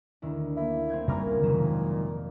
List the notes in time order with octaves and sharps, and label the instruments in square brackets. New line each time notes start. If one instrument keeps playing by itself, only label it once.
[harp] D2 D#3 E4
[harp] A#3 [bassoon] E4
[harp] C4 G6 G#6
[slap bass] G2 C#3 G3 [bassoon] A#2 [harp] A#4 A#5 F6
[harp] F1 D#5 E7 [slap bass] D#3 F#3 G#3